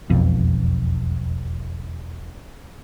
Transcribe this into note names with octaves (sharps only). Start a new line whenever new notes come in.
E1 B1 F2